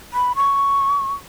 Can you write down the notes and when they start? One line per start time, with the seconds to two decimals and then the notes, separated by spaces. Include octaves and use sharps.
0.13 B5
0.36 C#6